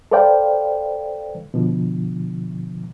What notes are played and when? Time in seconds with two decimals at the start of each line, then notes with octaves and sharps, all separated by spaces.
0.12 A4 B4 C5 D5 F5 G5
1.54 B2 D3 F3